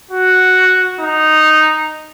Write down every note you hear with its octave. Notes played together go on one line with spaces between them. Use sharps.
F#4
D#4